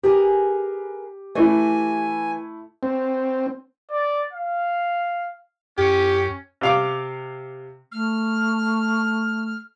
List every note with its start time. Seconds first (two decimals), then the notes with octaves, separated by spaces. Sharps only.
0.03 G4 G#4 A#4 B4
1.35 E3 A3 E4 G#5
2.83 C4
3.91 D5
4.33 F5
5.78 F#2 C#4 G4
6.61 C3 F5 D6
7.92 A3 F6